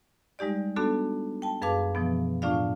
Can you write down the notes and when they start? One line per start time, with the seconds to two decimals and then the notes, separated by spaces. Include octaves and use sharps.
0.39 G3 G#3 D#4 G4 D5
0.76 A3 B3 D4 F#4 A4
1.42 G5 A5
1.62 F#2 G#4 B4 F5 A5 D6
1.95 B2 E3 F3 B3
2.42 A2 A3 D4 F4 D5 F5